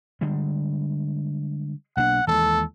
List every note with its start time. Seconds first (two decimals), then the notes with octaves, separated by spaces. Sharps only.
0.21 D3 G3 G#3
1.97 B1 A#3 D4 F#5
2.27 D#2 E3 G#3 A4